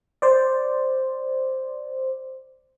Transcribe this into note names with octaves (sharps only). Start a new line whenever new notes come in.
C5 D5